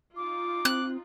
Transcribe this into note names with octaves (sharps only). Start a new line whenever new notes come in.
D#4 F4 D6
C4 F#6